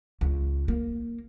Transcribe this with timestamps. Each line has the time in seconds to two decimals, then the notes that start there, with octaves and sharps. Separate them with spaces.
0.21 C#2
0.68 A#3